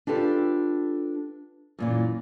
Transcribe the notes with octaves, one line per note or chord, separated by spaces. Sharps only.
D4 F4 G4 A4 B4
F#2 A#2 E3